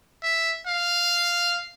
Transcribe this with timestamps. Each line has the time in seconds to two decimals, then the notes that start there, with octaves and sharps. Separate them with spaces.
0.23 E5
0.67 F5